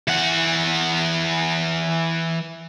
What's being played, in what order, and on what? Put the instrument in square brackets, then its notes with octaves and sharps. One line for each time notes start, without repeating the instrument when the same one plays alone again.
[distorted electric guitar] E3 F#5